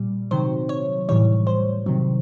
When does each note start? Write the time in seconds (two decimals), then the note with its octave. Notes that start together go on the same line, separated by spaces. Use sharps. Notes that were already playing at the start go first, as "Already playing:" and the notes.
Already playing: A#2 G3
0.31 C3 D#3 F#3 C5
0.69 C#5
1.09 A2 E3 G3 C#5
1.47 C5
1.86 C3 D#3 F#3